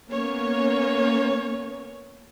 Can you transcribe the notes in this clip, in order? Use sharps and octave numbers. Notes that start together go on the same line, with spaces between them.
A#3 B3 C#4 C#5